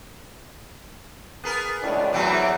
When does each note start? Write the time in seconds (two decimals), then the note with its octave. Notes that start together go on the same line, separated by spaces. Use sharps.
1.44 B3 G#4 A#4
1.82 C#2 A2 D4
2.13 E2 A2 E3 F#3 C4